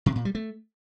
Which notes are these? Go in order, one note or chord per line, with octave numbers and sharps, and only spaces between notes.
C3
A#2
G3
A3